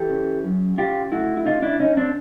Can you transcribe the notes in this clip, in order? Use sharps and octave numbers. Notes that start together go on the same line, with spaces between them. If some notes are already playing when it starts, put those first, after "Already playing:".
Already playing: E3 G4 A4
C#3
F#2
C#3 F4 G4
A3 E4 F#4
E4
C#3 D#4 F4
D4 E4
C#3 C#4 D#4
C4 D4